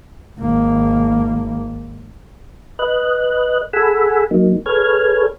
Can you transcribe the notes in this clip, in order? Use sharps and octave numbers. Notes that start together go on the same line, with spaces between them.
G#1 A#3
B4 D#5 F#6
G#4 A4 F#5 G#5 B5 E6
F#3 A#3 D#4
G#4 A4 B4 C#5 F6 G#6